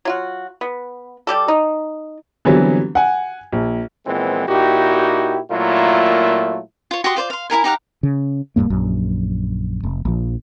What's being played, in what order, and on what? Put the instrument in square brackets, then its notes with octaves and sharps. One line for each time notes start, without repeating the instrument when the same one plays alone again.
[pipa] F#3 F4 F#4
B3
G3 G4 A4
D#4
[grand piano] D3 E3 F#3 G3 B3 C4
F#5 G#5
A#1
[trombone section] A#2 E3 F3 G#3 B3 C4
A#2 D#4 E4 F#4 G4
A#2 F#3 A3 A#3 E4 F4
[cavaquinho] F4 C#5
F#4 G4 C6 D#6
F4 C5 D5
F5 C6
E4 F4 A#4 G#5
D#4 G4 F5 F#5
[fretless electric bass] C#3
D#1 E2 G2 A#3
A#1 F#2
F1
A#1 F3